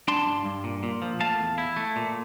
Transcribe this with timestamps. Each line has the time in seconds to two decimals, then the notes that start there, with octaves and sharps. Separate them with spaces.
0.08 D4 A5 C6
0.26 G2
0.45 G2
0.64 A#2
0.83 A#2
1.02 F3
1.20 A3 F5 A5
1.40 E2
1.58 E4
1.76 A3
1.96 A#2